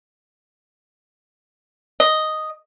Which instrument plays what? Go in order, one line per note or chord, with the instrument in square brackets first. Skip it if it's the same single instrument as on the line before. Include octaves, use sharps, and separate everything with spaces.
[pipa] D#5